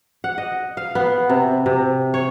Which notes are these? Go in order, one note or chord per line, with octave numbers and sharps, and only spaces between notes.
F#5
D#5
F5
B3
C3
C3
C#5